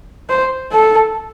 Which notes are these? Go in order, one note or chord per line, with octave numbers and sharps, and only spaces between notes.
C5
A4